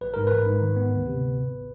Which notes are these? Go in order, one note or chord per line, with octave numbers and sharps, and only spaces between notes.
A1 B4
G#2 A#4
A1 B4
G#2
D#3
B3
D2
C3
D2
G#1